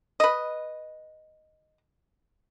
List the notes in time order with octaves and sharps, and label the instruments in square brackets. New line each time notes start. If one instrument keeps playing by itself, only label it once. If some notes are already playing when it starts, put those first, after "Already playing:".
[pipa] B4 D#5